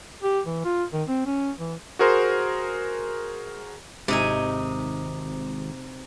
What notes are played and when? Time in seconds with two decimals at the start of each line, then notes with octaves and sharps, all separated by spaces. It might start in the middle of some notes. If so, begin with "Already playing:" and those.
0.23 G4
0.46 E3
0.64 F4
0.93 D#3
1.08 C4
1.26 C#4
1.59 E3
1.99 F#4 G#4 A#4 C5 C6
4.08 G#1 C3 D#4 G#5